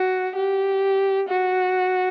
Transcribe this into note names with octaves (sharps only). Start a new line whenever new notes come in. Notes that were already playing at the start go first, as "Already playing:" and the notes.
Already playing: F#4
G4
F#4